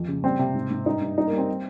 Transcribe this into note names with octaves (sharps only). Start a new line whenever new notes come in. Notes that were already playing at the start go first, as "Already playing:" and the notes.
Already playing: F2
C#3
G3 C4
C3
G#2
G#2
G2 D#4
G2
G3 D#4
A#3
G3
C4
G3